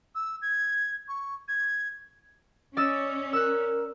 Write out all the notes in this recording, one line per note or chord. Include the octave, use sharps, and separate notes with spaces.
E6
G#6
C#6
G#6
C#4 D5 D#5 E6
A#4 E6 F#6